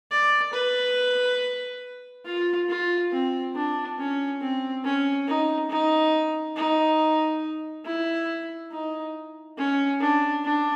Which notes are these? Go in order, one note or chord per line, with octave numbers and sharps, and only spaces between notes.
D5
B4
F4
F4
C4
D4
C#4
C4
C#4
D#4
D#4
D#4
E4
D#4
C#4
D4
D4